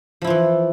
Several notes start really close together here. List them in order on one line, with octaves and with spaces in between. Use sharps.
F3 E4 F4 E3